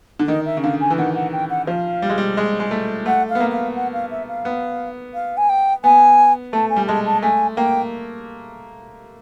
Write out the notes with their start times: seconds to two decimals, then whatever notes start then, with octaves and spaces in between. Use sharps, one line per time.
0.19 D3
0.28 D#3 D#5
0.46 E5
0.57 C#3
0.63 D3 F5
0.80 G#5
0.90 E3
0.98 D#3 F#5
1.15 F#5
1.32 G5
1.50 F#5
1.67 F3 F5
2.02 G3
2.09 G#3
2.18 G3
2.37 G#3
2.60 G#3
2.71 A3
3.06 A3 F#5
3.29 F5
3.35 B3
3.40 A#3
3.52 F5
3.75 F#5
3.93 F5
4.11 E5
4.28 F5
4.45 B3
5.14 F5
5.37 G#5
5.49 G5
5.84 B3 G#5
6.53 A3 A5
6.70 G#5
6.76 G3
6.87 G#3 A5
7.06 A5
7.22 A3 G#5
7.57 A#3 G5